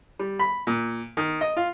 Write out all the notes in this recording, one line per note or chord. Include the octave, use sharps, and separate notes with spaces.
G3
B5
A#2
D#3
D#5
F4